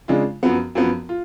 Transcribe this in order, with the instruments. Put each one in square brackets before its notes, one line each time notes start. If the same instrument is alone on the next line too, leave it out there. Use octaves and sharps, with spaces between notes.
[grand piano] C#3 G#3 D4 F4
F#2 F3 B3
F#2 F3 B3
F4